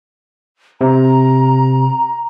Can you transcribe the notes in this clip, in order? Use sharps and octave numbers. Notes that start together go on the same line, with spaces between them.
C3 A#5